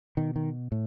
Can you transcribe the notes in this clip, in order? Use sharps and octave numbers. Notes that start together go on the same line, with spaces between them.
B2 D#3
D#3
A2